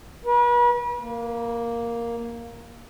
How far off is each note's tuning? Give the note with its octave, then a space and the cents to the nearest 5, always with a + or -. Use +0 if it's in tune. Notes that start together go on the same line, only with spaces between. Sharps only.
B4 -40
A#3 +0